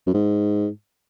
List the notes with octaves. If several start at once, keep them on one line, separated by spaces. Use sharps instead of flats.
F#2
G#2